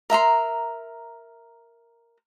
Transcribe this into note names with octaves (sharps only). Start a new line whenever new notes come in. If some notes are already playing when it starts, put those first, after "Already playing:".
A#4 E5 A#5 C6